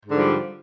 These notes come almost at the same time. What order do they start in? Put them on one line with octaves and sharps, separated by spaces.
G#2 D3 F3 G3